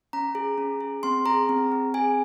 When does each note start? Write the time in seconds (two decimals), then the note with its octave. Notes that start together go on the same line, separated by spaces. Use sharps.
0.13 C#4 A#5
0.35 G#4
0.58 C#4
0.81 G#4
1.03 C4 C6
1.25 G#4 A#5
1.49 C4
1.72 C4
1.94 G#4 G#5